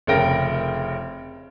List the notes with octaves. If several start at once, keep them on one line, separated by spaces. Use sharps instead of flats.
F1 C#3 A#4 G5 A#6